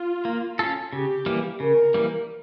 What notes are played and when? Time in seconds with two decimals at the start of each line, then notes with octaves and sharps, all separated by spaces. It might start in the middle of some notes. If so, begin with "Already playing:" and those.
Already playing: F4
0.25 A#3
0.59 C#4 F4 A4
0.92 C#3 G4
1.26 E3 G3 A#3
1.60 C#3 A#4
1.94 E3 G3 A#3